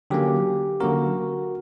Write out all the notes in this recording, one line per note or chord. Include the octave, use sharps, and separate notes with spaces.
D3 F#3 A#3 C#4 G4
D3 F#3 A#3 C#4 F#4 A#4